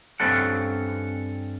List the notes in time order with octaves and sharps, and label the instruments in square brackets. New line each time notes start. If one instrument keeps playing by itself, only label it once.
[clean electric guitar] G2 C4 C#4 A4 F#5